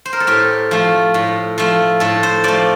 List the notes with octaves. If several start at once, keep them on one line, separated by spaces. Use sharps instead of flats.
C5
A#4
A4
A2 G4
F3 A3
A2
F3 A3
A2 A4
C5
F3 A3 D5